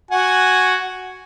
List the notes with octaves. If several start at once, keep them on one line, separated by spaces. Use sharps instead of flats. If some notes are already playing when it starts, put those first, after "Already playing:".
F#4 F#5 G#5